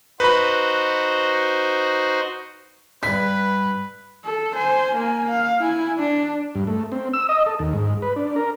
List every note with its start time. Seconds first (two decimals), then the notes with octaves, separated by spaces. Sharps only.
0.20 D#4 F#4 B4 C5 B5
3.03 G2 B4 G#5 B6
4.24 A4
4.55 C5 G#5
4.95 A#3 G#5
5.28 F5
5.60 E4 G#5
5.99 D4
6.55 G2
6.67 A3
6.92 C4
7.13 E6
7.29 D#5
7.46 A4
7.59 D#2
7.73 G#2
8.02 B4
8.16 D4
8.36 A#4